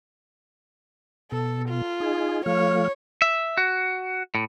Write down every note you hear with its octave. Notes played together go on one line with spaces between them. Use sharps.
B2 A4
F4
D#4 G#4
F3 A3 C#5 F5
E5
F#4
A2